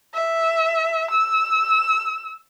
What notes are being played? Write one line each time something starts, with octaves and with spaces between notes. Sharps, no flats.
E5
E6